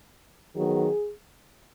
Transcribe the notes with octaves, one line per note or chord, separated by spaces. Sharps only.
D#3 F#3 B3 D#4 G#4